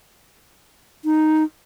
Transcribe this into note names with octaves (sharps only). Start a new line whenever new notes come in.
D#4